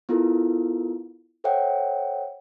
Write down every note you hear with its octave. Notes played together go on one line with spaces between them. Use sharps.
B3 E4 F4 A4 A#4
A4 C5 C#5 E5 F#5 G5